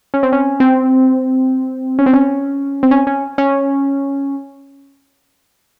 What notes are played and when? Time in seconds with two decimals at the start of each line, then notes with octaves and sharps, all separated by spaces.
0.14 C#4
0.23 C4
0.33 C#4
0.60 C4
1.99 C#4
2.06 C4
2.14 C#4
2.83 C4
2.91 C#4
3.07 C#4
3.38 C#4